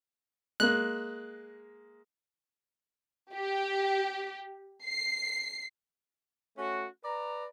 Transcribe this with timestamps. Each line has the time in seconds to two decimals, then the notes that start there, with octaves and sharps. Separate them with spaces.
0.60 G#3 A#3 F#6
3.33 G4
4.85 C7
6.58 A3 C#4 F#4
7.05 B4 D5 A#5